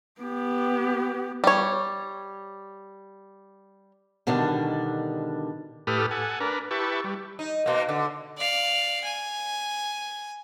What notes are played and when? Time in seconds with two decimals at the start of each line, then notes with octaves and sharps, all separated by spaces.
0.21 B3 G4
1.44 G3 C#5
4.27 B2 D3 D#3 G3 D4
5.87 A2 G4 A4 B4 D#6 F6
6.11 A4 F#5 G#5
6.40 D4 A#4 B4
6.71 E4 G4 B4 A5 C#6
7.04 G3
7.39 D#4
7.66 B2 A#3
7.89 D3
8.37 D5 F5
9.04 G#5